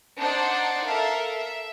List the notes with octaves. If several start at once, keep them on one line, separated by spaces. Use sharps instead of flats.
D4 D#4 C5 D5 F#5
A4 A#4 E5 F5
E5